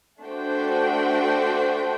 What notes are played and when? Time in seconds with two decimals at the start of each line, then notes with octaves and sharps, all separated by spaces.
0.22 A3 D4 F#4 C5 G5